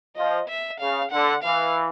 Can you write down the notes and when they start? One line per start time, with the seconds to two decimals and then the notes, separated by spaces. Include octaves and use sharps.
0.17 F3 D#5
0.49 E5
0.80 C#3 F5
1.12 D3 F#5
1.44 E3 F5